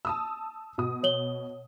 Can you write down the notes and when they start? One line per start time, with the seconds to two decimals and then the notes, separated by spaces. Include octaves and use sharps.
0.05 A5 D#6 E6
0.78 B2 D#6
1.03 C#5 F#7 G7